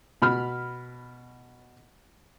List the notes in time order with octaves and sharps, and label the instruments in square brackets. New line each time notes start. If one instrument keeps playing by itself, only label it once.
[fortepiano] B2 B5 F6